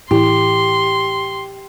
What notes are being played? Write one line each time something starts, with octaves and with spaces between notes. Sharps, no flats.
A2 E3 E4 G4 C6